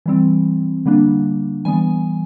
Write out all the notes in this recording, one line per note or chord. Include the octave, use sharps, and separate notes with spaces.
E3 G3 C4
D3 G3 A#3 D4
E3 G3 B3 G#5